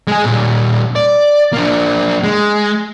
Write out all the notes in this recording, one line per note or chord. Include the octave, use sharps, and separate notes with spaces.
G#3 G#4
A#2 G3
D5
A#3 D4
G#3